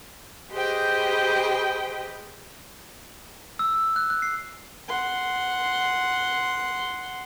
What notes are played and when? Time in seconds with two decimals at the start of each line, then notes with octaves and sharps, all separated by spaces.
0.51 G4 G#4 B4 C5 D#5 G5
3.59 E6
3.75 E6
3.96 F#6
4.10 F#6
4.22 C7
4.88 F#5 C6